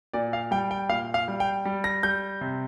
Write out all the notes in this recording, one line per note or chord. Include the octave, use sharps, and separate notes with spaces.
A#2 D5
F5
G3 G5
G5
A#2 F5
F5
G3
G5
G3
A#6
G3 G6
C3